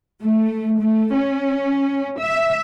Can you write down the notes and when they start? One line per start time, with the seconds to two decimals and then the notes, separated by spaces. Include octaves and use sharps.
0.22 A3
0.80 A3
1.15 C#4
2.18 E5